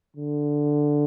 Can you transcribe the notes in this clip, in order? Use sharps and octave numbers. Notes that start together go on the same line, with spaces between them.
D3